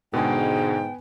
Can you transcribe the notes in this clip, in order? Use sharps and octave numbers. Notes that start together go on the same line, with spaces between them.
G#2 B2 D3 G#3 B3 G5 G#5